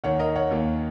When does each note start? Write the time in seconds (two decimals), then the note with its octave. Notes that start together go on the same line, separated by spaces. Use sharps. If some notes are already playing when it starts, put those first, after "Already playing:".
0.04 D#2 D#3 A#3 C#5 F#5
0.19 A#4 D#5
0.36 C#5 F#5
0.51 D#2 D#3 A#3